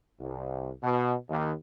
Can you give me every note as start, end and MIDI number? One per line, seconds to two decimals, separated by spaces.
0.20 0.70 36
0.82 1.14 47
1.29 1.51 39